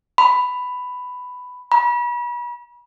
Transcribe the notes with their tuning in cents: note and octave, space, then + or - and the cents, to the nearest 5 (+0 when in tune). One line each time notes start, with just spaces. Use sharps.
B5 +10
B5 -35